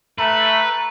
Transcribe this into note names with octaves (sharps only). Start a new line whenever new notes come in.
A3 B4 A#5